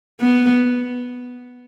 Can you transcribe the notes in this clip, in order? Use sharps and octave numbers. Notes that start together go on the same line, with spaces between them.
B3